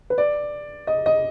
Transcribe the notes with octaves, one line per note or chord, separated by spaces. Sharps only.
B4
D5
D#5
D#5